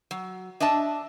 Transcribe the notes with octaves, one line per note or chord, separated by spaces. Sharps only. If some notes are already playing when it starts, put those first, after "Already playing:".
F#3
D4 D#5 E5 A5